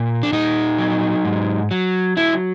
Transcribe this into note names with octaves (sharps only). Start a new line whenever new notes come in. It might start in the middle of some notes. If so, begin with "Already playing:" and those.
Already playing: A#2
D4
A#2 D#4
F#3
G#2
F#3
F#3 E4